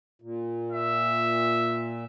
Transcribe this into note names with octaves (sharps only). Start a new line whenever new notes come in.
A#2
E5